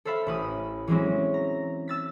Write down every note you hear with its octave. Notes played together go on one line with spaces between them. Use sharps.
A4 C5 E5 F5 B5
A1 B4 D#6
E3 F#3 G#3 C4 C#4 F#4
A#5
E6 A6 B6